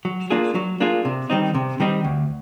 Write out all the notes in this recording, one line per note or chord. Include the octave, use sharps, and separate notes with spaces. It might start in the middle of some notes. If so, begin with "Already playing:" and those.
F#3
A#3 D4 F4 G#4
F#3
A#3 D4 F4 G#4
C3
D#3 G3 C4 D#4
C3
D#3 G3 C4 D#4
D2